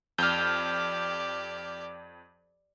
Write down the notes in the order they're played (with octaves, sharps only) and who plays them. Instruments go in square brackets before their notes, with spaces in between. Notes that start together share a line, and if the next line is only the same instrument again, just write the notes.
[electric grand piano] F2 [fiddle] G4 D5 [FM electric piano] F6 G6